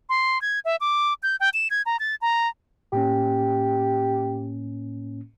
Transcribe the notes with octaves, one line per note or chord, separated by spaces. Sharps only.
C6
G#6
E5
D6
G6
G5
E7
G#6
A#5
A6
A#5
A2 A#3 C#4 G4